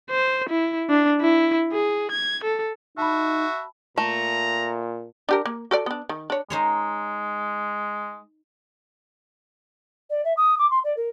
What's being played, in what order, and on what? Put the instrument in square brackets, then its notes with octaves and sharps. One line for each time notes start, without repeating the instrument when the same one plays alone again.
[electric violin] C5
E4
D4
E4
G#4
G#6
A4
[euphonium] D#4 [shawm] F#4 [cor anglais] E5 [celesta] A5 B5
[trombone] A#2 [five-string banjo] A3 [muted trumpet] A#5
[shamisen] D4 G4 A#4
A#3
F#4 A4 D5
B3 D4
D#3
D4 C#5
[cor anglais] G#3 [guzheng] D#4 C5 C#5
[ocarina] D5
E5
D#6
D6
C6
D5
A#4